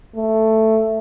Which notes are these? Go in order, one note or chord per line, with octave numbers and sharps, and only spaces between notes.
A3